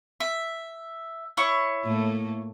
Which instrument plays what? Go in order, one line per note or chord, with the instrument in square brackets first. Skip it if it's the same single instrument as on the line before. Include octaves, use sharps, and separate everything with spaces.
[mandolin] E5
E4 C#5 C#6
[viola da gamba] A2 A3 A#3